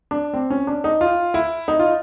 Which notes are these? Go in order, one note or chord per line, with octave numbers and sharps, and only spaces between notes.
D4
C4
C#4
D4
D#4
F4
E4
D#4
F4